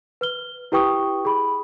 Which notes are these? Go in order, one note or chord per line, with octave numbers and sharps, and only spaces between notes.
B4 F6 G7
E4 G4 B4 G5 C#6 D#6
G#4 B5